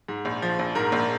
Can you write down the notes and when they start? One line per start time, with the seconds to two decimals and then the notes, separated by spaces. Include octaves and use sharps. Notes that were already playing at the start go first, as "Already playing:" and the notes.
0.08 G#2
0.25 A#1
0.42 F3
0.59 A#1
0.75 G#2 A#4
0.92 A#1